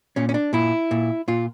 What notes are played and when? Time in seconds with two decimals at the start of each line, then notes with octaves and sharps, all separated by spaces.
0.16 A#2 C#4
0.29 C#4
0.34 D4
0.53 A#2 E4
0.91 A#2
1.28 A#2 F4